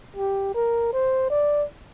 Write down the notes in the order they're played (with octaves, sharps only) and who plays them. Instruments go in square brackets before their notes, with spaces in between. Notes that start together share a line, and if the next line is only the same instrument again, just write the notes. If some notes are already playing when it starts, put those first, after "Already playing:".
[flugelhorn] G4
A#4
C5
D5